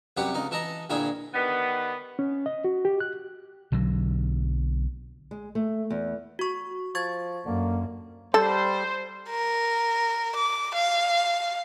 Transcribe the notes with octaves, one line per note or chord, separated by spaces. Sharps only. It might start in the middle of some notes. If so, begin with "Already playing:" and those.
C2 F#2 G4 B4 F#5
C#2 D#4
E3 A4 D#5 A#5
D2 A#2 E4 G#4 G5
D#3 G3 B3
C#4
D#5
F#4
G4
F#6
B1 D3 F#3
G#3
A3
E2
F#4 C#6
F3 C#6 G#6 A6
F#2 D3 A#3
G3 A4 C5
A#4
D6
F5